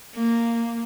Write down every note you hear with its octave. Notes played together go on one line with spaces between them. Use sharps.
A#3